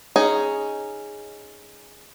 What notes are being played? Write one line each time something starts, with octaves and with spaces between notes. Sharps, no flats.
C#4 D#4 G#4